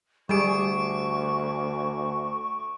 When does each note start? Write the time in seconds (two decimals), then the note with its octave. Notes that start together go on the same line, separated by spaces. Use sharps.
0.29 D2 G3 G#4 C#6 D6 D7